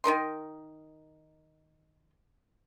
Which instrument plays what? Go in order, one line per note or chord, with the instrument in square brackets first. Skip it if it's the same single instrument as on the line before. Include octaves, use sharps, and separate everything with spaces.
[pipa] D#3 D#4 A#4 C6